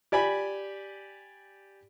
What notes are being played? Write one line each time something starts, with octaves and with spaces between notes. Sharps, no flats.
G4 D5 G#5 B5